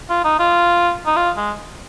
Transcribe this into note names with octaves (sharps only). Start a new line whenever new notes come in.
F4
D#4
F4
D#4
F4
G#3